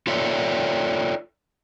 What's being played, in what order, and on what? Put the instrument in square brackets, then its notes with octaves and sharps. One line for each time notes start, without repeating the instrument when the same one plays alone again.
[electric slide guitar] F4 A4 C#5 D5 E5